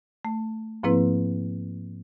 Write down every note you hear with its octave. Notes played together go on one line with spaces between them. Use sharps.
A3
G#2 F3 A#3 C4 E4 B4